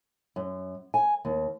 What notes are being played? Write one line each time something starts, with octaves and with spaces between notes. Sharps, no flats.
F#2
G#5
D#2